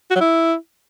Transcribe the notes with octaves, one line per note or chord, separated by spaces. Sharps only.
F#4
F#3
E4